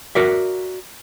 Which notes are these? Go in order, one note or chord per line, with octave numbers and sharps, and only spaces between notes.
F#4 A#4 D5 E5